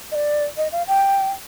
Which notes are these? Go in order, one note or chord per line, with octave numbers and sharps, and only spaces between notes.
D#5
D5
D#5
F5
G5